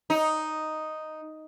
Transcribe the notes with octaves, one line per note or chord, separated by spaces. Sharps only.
D#4